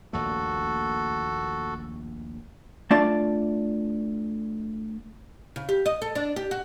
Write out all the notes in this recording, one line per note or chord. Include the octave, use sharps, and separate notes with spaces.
A#1 D#2 A3 F#4 A4
A3 D4 F4 D5 A5
C#3
G4
D#5
A4
D4
G4
F#4